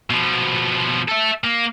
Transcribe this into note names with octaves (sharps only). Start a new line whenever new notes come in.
B2 F3
A4 E5
A#3